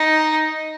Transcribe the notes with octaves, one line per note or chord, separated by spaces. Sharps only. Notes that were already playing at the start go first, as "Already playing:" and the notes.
Already playing: D#4